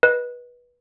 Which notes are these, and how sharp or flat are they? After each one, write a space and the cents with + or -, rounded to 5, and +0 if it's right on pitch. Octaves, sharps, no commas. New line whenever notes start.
B4 -20 D#5 -15